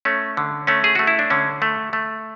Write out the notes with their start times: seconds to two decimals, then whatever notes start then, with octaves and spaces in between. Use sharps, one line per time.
0.05 A3 C#4
0.37 D3
0.67 A3 C#4
0.84 G#4
0.95 A3 F#4
1.07 E4
1.19 D4
1.30 D3 C#4
1.62 A3
1.93 A3